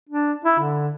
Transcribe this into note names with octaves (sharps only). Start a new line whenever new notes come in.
D4
E4
D3